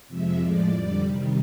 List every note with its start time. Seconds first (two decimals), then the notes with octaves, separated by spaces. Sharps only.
0.08 F2 C3 F3 G#3 E5
0.39 A2 F3 G#3 D5
0.69 F2 D3 G3 D5
1.00 C3 D#3 G3